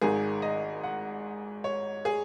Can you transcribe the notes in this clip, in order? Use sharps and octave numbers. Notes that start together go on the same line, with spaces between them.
G#1 G#2 D#3 G#4
D#5
F#5
C#5
G#4